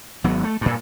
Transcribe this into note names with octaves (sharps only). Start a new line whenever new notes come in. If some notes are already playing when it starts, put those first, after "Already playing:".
G#1 F#3 B3
A3
G2 A#2